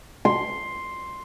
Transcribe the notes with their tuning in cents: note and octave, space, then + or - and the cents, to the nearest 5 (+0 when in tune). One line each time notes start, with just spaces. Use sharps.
C6 +5